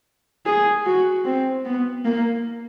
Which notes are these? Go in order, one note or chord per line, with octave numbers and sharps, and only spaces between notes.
G#4
F#4
C4
B3
A#3